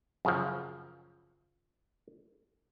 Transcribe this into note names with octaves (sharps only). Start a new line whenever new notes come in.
F#2 C#3 F3